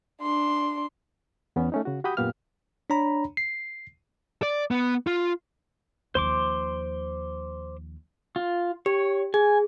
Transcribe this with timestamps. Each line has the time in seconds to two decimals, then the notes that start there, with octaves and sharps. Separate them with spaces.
0.22 D4 C6
1.56 E2 B3 C#4
1.72 A3 C#4 D#4
1.85 C#3 F#4
2.04 F#4 G4 F#5 B5 D#6 G6
2.17 F#2 A#2 B3 G4 F5 F6
2.90 D4 C#5 A#5 B5
3.37 C7
4.43 D5
4.71 B3
5.07 F4
6.15 D#2 F3 C5 C6 D6
8.36 F4
8.86 G4 C#5
9.34 G#4 G#5